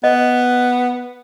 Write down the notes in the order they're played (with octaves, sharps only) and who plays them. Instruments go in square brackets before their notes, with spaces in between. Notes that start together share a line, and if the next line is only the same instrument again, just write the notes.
[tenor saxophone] B3 [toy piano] D#5